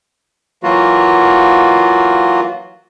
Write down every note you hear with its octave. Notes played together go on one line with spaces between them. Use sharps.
E3 F#3 A#3 F4 F#4